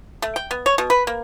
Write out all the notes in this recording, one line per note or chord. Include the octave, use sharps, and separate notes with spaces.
A3
G5
B3
C#5
B2
B4
A#3